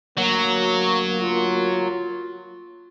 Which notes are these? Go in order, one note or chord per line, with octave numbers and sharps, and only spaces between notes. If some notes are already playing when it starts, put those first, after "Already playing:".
D2 F#3 A#3
F4